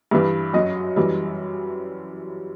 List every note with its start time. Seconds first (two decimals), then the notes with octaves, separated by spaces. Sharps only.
0.11 G2 E3 G3
0.54 F#2 F#3 D#5
0.96 F#2 E3 G3